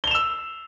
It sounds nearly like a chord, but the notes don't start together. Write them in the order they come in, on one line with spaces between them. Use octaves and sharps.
G7 F7 E7 E6